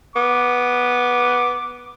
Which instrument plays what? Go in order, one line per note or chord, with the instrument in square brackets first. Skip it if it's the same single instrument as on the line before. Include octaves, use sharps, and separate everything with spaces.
[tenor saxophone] B3 [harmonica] D6